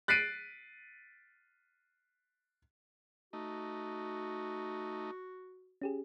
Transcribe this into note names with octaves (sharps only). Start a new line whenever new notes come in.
F#6 A6 B6 C7 D7 D#7
A3 D#4 F#4
C#4 G4 G#4